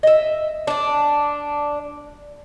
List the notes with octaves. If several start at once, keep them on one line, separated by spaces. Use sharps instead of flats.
D#5 E5
D4 D5